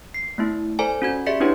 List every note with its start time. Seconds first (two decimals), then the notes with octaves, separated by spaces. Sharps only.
0.14 C7
0.38 A3 B3 E4
0.79 A4 C5 D5 G#5 A#5
1.02 C#4 F#4 G#6
1.26 G4 G#4 D5 E5 B6 C#7
1.41 C#4 D4 E4 G4 B4 C#5